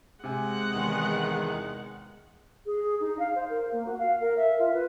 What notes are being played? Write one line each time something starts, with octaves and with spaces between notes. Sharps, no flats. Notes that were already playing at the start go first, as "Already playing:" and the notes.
C3 G#3 F#5 G#5
E2 D#3
G#4
D#4
F5
C5
A#4
A#3
F#4
F5
A#4
E5
F4
B4